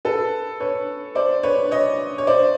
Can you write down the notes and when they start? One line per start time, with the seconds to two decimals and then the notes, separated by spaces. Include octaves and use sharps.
0.05 A4 B4
0.60 B4 C#5
1.15 C5 D5
1.43 B4 C#5
1.71 C#5 D#5
2.18 C#5
2.27 C5 D5